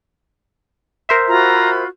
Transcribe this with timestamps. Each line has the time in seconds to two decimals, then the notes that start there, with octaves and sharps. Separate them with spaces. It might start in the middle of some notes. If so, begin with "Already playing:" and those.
1.09 A#4 C5 E5
1.28 F4 F#4 A#5 B5